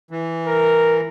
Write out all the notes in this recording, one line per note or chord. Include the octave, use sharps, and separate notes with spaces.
E3
A#4